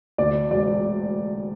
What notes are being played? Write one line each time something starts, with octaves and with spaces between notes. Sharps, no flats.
D2 D5
E1 D5